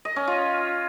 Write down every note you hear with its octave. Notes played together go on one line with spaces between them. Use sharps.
D#5
C#4
F4